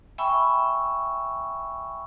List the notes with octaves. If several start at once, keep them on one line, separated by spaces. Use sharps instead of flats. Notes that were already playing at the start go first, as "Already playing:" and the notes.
E5 G5 G#5 B5 C#6 E6